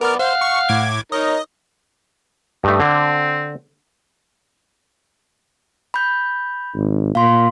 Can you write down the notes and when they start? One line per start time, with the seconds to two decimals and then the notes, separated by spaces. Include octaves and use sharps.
0.01 B3 A#4 D5 F6
0.19 C5 F5 F#5
0.41 C#6
0.69 A2 D6 G#6
1.12 D#4 A#4 C#5 D#5
2.64 G2 A3 D#4
2.80 D3 C4
5.94 B5 G6
6.75 G#1
7.15 A#2 F5 C6